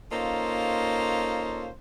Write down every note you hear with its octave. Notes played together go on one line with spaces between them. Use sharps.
A#3 C#4 D#4 F4 A4 C5